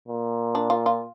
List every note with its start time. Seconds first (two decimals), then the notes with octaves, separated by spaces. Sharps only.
0.08 A#2
0.55 D4
0.70 F4
0.86 F4